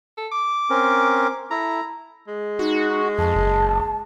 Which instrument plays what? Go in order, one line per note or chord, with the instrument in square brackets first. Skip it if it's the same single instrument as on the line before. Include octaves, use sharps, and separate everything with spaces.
[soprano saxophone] A4
D6
[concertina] C4 C#4 A#4
[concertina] E4 A4 [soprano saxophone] A#5
[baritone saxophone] G#3
[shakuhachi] D#4 [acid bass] F#4
[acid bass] F2 [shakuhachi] A5
[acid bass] F#1